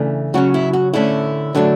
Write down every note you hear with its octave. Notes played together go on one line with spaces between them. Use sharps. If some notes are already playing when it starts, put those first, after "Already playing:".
Already playing: C#3 E3 A3 D4
C#3 F#3 C#4 F#4
E4
F#4
D3 A3 C#4 E4
D3 F#3 A3 D4